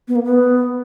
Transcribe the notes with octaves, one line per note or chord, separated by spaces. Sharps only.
B3
A#3
B3